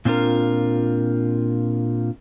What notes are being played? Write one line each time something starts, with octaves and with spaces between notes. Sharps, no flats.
A#2 C4 D4 F4 A#4